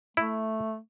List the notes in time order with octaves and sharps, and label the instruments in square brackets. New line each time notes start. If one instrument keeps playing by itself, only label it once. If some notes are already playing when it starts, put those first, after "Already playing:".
[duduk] A3 [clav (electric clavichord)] E4